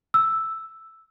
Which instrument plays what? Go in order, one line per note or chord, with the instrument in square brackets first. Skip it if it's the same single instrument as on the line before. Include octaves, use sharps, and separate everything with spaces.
[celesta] E6